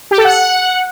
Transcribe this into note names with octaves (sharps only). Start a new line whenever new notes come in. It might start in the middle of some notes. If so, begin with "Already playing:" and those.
G4
A4
F#5